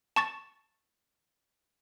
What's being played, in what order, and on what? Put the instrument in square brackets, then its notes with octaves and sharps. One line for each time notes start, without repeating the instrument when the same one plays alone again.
[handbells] A5 C#6 A6